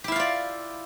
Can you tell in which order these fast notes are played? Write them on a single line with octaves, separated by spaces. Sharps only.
G4 E4 F5 F4 D5